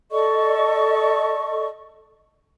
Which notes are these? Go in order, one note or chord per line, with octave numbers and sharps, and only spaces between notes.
A4 D5 D#5 C#6